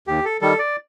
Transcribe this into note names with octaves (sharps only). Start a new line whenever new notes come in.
D#2 G4
A4
D#3 G3 A4
D5